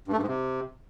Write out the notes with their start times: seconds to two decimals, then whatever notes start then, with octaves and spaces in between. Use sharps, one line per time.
0.08 G2
0.13 A3
0.18 G2
0.23 G#2
0.28 C3